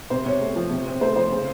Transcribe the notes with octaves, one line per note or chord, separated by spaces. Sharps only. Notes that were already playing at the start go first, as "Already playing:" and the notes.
C3 C5
C3 C#5
A3
F3
C3
C4
A3 C5
F3 C5
C#3